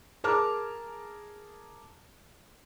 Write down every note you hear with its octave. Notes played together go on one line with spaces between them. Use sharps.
G#4 A#4 A5 A#5 D6 F6